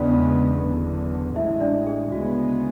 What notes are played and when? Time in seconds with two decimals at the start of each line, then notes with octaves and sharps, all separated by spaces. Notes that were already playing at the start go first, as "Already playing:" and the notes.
Already playing: E2 C#3 G#3 B3 D4 D5
0.59 F#1 E2 D3
1.35 A1 A2 G#3 E4 E5
1.60 D4 D5
1.87 G#4
2.12 D2 C#3 G#3 B3 F#4